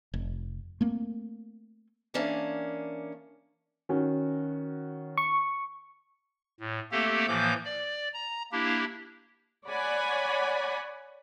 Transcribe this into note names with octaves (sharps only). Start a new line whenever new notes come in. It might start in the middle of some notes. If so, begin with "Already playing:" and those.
F1
A3 A#3 C4
E3 A#3 C#4 D4 F5
D#3 C#4 F#4
C#6
A2
A3 A#3 C4 G4 A4
A2 E3 F3 A#3 D6 G6
D5
A#5
A#3 D4 E4 G4
C#5 D5 F#5 G#5 B5